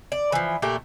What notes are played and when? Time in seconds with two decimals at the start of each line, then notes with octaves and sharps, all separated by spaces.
0.12 D5
0.32 E3 F3
0.62 A#2 A3 G4